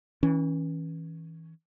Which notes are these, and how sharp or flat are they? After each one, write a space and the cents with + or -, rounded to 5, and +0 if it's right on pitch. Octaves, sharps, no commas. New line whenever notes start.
E3 -35 C#4 +0